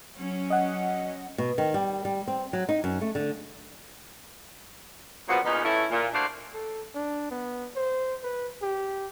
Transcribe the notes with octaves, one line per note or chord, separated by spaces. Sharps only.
F#3 C#4
D#5 F#5
B2
D#3
G3
G3
C4
F#3
D#4
F#2
A3
D3
A#2 C#3 F3 F#3 B3 F#4
E2 A#2 B3 C#4 D#4
E3 A3 C#4 E4
A#2
A3 A#3 D4 F#4 C5 D5
A4
D4
B3
C5
B4
G4